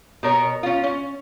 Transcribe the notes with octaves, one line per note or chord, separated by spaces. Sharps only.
B2 A#4 C#5
C#4 F4
C#4